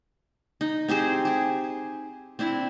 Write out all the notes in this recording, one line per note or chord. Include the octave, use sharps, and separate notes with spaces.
D#4
C4 G4 G#4 C5
G4 G#4
C4 D4 E4